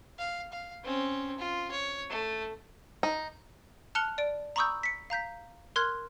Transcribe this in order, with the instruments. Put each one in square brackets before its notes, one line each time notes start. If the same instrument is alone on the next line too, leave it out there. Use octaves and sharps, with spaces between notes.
[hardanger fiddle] F5
F5
C4 C#4
F4
C#5
A3
[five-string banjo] D#4
[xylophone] A5 F6 F#6 C#7 F7 G7
D5 D7
A#5 B5 C#6 D#6 E6 G6
B6 C#7
F5 A#5 G6 B6
A#4 C6 F6 F#6 G#6